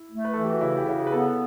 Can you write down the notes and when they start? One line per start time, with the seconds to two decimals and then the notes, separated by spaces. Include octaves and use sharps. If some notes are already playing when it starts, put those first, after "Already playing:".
Already playing: E4
0.10 A3
0.25 B4
0.33 E3 A4
0.44 G4
0.52 F#4
0.61 C#3 E4
0.77 G4
0.86 C#3 F#4
1.07 B4
1.12 B3 A4